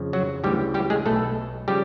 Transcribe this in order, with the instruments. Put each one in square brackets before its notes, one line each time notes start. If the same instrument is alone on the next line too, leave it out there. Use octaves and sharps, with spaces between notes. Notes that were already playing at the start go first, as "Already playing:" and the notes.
Already playing: [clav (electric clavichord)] F2 C#3 F3
F#3 F#4
D2 C#3 E3 G3 G4
G3 G4
G#3 G#4
B1 B2 A3 A4
C#3 F3 G3 G4